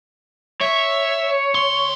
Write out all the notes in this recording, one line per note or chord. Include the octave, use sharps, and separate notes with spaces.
C#5 E5
D2 C6